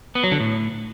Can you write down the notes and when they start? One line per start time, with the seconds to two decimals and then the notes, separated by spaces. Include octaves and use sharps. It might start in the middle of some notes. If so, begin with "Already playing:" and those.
0.15 B3
0.24 F#3
0.32 D3
0.40 A2